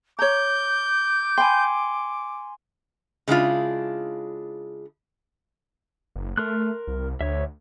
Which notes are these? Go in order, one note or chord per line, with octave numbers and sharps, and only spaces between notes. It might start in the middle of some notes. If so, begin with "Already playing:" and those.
C#5 A#5 D6 G6
G5 G#5 B5 C6
C#3 G#3 D4 E4 F4
F#1
A3 A#4 C6 F#6
C2
D2 C#5 E5